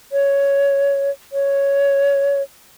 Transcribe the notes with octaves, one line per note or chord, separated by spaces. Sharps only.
C#5
C#5